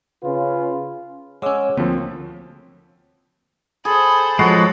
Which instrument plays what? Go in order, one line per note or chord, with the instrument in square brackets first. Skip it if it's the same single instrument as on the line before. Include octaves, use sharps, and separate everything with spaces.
[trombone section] C#3 C#4 F4 B4
[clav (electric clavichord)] G#3 C#4 [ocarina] C#5 [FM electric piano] F#5 D6 E6
[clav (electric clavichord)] D2 [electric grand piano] F3 C4 [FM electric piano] A#3
[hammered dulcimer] G#4 [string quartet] A4 C5 [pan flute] B5
[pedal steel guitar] F3 G#3 [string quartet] F#3 A4 [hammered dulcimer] F#4